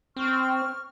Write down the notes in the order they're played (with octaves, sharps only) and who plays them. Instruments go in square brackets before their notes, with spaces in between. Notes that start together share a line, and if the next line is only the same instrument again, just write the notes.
[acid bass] C4 [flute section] C#6 F6